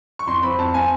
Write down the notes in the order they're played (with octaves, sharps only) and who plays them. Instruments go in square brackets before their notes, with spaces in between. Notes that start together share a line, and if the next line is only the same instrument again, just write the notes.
[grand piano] C#6
F2 C6
C4 B5
F2 A5
C4 G#5